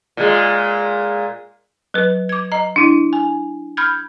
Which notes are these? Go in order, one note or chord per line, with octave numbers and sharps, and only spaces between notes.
A#2 G#3
F#3 B4
D6 G#6
D#5 A#5
D4 E4
G#5
B5 F6 G6 G#6